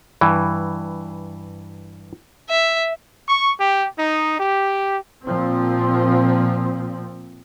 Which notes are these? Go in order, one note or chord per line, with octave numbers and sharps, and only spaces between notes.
G2 E3
E5
C#6
G4
D#4
G4
A#2 F3 C4